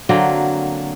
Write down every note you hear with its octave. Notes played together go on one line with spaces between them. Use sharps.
D3 F#3 A#3 C4